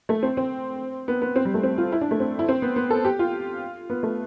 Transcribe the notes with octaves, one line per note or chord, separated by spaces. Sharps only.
A3
C4
C4
B3
B3
C4
G3
A3
C4
F4
E4
D4
A3
C4
E4
C4
B3
B3
A4
G4
F4
B3
A3